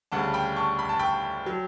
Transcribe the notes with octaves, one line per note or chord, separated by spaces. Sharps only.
D2 C#3 G3 F#5 A5
G5 B5
A5 C#6
B5
A5
G5 B5
F#3